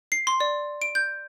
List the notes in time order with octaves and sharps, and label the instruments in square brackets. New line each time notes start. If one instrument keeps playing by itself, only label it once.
[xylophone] C7
C6
D5
D7
G6